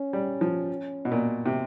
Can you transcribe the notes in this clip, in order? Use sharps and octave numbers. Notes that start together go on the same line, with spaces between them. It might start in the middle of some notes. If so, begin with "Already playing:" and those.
Already playing: C#4
G3
F3
B2
A#2
C3